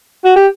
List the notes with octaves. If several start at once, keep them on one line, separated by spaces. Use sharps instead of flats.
F#4
G4